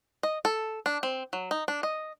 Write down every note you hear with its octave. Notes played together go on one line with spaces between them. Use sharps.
D#5
A4
D4
C4
F#3
D#4
D4
D#5